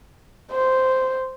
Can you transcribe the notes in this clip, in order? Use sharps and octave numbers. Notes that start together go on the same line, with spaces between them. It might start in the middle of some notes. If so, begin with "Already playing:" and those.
C5